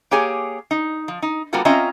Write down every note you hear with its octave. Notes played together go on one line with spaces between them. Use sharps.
A#3 G4 G#4 C#5 G#5
D#4
F3
D#4
G3 A#3 B3 F4 F#4 A4
C4 C#4 F4 D#5 E5 A#5